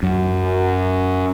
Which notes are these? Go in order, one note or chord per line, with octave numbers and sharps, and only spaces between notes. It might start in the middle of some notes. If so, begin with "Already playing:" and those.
F#2